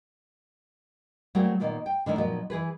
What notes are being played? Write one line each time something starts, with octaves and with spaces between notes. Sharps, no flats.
F#3 A3 A#3 C4 G#4 D5
A#2 D#3 A#3 B3 F4
G5
D3 D#3 A3 E4
A#2 F3 F#3 B3 D#4 A#4
E3 G#4 B4